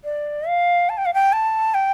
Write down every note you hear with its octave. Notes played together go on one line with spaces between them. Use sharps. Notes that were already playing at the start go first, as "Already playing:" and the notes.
D5
F5
A5
G5
F5
G5
A5
G5